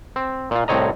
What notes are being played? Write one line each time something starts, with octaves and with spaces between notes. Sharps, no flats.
C4
A#2 F4
C2 A2 C4 C#5 D#5 A#5